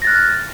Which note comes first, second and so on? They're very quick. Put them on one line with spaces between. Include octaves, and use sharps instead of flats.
A#6 A6 F#6 F6